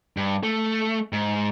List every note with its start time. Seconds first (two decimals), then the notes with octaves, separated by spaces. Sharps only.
0.17 G2
0.43 A3
1.13 G#2